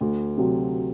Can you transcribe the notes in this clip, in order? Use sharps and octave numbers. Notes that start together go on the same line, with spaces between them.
D2
C3 F#3